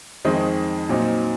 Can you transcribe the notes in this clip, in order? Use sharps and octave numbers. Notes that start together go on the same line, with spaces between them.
F2 D#3 G#3 C4 D#5
A#2 F#3 C4 D#4